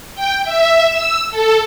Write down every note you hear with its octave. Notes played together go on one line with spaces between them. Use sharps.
G5
E5
E6
A4